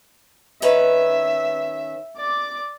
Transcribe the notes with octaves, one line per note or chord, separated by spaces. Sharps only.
D#3 C#4 B4 E5
D5 D6